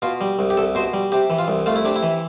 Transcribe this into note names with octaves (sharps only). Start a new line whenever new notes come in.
B2 F4
G3
C2
G4
C2 A4
B2 C5
G3
C3 G4
E3
F4
C2
A3 F4
E4
C3 D4
E4
E3